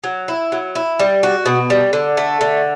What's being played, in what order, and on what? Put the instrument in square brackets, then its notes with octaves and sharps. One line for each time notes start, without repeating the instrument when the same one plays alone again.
[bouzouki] F#3
E4
F#3
E4
G3
F#4
B2
G3
D3
A3
D3